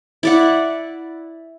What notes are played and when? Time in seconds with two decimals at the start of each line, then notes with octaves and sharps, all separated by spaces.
0.23 E4 D5 F#5